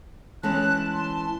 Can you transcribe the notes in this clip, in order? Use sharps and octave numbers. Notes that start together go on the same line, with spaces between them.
E3 G#3 C#4 A5 F#6
C6